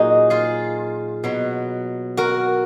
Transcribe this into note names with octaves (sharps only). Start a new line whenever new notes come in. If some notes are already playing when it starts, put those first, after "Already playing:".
Already playing: A#2 F#3 D#4 F#4 G#4
F4 G#4
B2 F#3
F#4 A#4